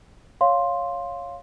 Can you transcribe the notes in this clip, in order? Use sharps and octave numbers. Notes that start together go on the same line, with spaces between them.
C#5 F5 C6